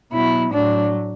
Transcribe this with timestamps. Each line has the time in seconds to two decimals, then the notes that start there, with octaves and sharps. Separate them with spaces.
0.12 B2 F#3 E4
0.52 A2 F#3 D4